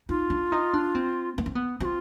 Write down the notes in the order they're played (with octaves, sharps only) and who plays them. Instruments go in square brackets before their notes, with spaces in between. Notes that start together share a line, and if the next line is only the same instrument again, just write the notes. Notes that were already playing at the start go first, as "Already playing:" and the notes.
[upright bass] D#4 [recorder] F4
[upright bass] D4
D#4
D4
C4
B3
C4
B3
[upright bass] C4 [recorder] F#4
[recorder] F4